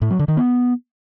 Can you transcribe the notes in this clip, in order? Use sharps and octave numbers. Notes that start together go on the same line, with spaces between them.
A2
F#3
D3
D#3
B3